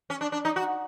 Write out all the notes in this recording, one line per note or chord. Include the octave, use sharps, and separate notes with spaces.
C#4
D4
D4
D#4
F#4